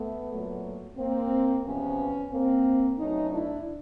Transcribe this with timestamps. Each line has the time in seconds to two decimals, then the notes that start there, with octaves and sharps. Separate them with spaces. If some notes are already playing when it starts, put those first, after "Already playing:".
Already playing: A3 B3
0.31 A#2 F#3 A3
0.98 A#3 C4
1.65 E2 C3 F3 B3 C#4
2.32 A#3 C4
2.98 B2 F#3 A3 C#4 D#4
3.31 D4 E4